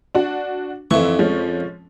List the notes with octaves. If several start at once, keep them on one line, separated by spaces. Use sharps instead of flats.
D4 F#4
F2 E3 E4 C#6
F3 G#3 C#4